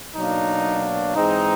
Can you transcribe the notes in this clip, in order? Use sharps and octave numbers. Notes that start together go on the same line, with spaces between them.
B2 F#3 A#3 D4 D#4
G#2 E3 G#3 C4 D#4